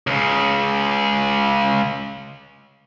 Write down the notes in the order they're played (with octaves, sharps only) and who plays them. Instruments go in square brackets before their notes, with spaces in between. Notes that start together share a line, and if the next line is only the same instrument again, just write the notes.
[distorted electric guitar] C#2 C#3